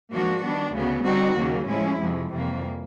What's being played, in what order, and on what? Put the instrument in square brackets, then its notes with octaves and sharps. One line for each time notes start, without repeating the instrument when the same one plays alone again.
[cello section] G#2 F3 A#3 D4 F#4
D#3 G3 B3 D4
D2 C#3 F#3 B3
D3 G3 C4 D#4 F#4
D#2 C#3 F#3 A#3
A2 F3 G#3 C#4 E4
F2 C3 F3 G#3
F2 C3 E3 G3 A#3